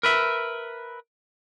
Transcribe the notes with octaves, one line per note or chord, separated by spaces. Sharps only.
A#4 B4 E5